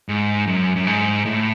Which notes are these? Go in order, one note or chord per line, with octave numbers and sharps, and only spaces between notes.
G#2
F#2
F#2
G#2
A2